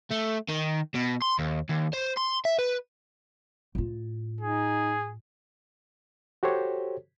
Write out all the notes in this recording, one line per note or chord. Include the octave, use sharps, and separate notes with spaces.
A3
D#3
B2
C6
D#2
D#2
C5
C6
E5
B4
A2 F4
D#4 G#4
F#4 G4 A4 C5 C#5